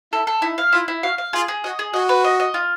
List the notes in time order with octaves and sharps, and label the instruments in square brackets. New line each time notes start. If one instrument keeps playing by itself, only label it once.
[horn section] E4 [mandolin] A4
[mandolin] A4
[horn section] D#4 [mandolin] E4
[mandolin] F5
[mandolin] E4 [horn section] F4
[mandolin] E4
[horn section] F#4 [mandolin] F5
[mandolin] F5
[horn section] F4 [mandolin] G#4
[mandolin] G#4
[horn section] F#4 [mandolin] D#5
[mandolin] G#4
[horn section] F#4 [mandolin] D#5
[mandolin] B4
D#5
D#5
F4